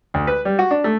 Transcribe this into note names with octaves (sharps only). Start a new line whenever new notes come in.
D2
B4
G3
F#4
D4
A3